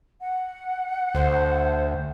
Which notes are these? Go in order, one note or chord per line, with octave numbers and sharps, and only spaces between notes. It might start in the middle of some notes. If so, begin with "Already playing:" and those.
F#5
D2 C5